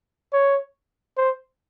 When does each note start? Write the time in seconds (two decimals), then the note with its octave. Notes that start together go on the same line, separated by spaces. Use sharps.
0.33 C#5
1.17 C5